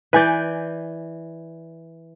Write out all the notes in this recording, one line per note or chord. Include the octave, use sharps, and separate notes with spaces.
E3 B4 D5 G#5 G6